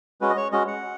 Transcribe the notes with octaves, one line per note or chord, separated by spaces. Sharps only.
G#3 C#4 F#4 B4
D#5
C#5
G#3 C#4 F#4 D#5
F#5